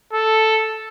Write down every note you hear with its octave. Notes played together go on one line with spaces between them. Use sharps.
A4